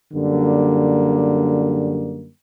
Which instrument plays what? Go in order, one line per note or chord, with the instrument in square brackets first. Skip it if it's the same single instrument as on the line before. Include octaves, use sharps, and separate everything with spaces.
[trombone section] F#2 D3 G3 A#3